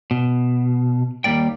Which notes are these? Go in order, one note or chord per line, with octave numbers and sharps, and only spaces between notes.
B2
D#2 G3 A#3 D5 G5